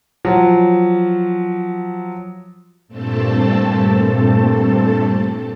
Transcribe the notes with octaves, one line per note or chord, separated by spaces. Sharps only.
F3 F#3
G2 A#2 A3 C4 A4 A5